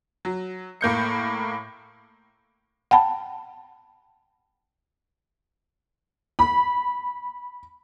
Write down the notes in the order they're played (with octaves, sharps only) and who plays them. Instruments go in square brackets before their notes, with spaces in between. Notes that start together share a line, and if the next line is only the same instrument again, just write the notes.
[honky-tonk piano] F#3
A2 A#3 G6 C#7
[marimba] F#5 G5 A5 B5
[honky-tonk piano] B5